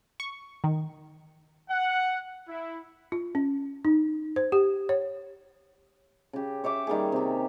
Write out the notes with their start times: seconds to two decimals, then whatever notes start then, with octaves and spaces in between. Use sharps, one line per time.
0.20 C#6
0.64 D#3
1.70 F#5
2.48 E4
3.12 F4
3.35 C#4
3.85 D#4
4.36 C5
4.52 G4
4.89 C#5
6.33 C#3 G4
6.64 C#5 E5 G5 D6
6.87 D#3 G3 A#3 G#4
7.12 C3 G4